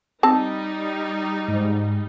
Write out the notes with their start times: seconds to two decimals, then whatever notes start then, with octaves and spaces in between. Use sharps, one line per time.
0.23 G3 C4 D#4 A5
1.48 G#2